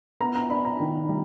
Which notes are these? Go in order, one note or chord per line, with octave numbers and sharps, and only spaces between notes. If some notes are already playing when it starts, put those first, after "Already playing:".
B3 A#5
A#5
D4 B5
A#5
D#3
G3